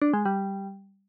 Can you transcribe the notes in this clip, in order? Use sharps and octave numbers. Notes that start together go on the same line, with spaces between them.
D4
G#3
G3